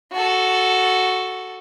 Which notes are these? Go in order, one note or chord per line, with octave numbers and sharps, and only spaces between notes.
F#4 A4